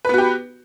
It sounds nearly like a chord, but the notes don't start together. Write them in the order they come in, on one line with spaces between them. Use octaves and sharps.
B4 B3 F#4 G4